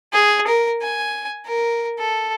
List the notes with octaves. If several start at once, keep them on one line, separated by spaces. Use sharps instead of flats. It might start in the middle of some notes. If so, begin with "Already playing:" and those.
G#4
A#4
G#5
A#4
A4